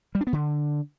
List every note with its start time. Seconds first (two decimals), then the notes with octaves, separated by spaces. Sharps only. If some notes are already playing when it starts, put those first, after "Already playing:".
0.15 G3
0.21 D4
0.27 B3
0.33 D3